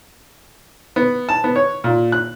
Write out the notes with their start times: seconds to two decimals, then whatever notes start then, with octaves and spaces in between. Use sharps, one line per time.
0.96 B3
1.29 A5
1.44 B3
1.56 C#5
1.84 A#2
2.12 F#6